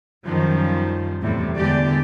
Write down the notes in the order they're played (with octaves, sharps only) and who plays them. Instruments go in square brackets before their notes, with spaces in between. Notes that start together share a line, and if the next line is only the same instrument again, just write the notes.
[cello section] F#2 D#3 F3 G3
E2 A2 C3 G3
E2 D3 G#3 G4 D5